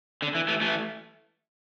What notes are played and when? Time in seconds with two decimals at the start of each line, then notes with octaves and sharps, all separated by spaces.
0.22 D3
0.35 E3
0.48 E3 A3
0.62 E3 A3